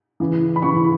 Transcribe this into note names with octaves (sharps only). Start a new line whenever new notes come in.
C#3 E3
B5
C#3 E3 C#6